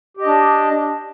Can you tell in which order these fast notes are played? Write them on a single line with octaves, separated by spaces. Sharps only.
G4 D#5 D4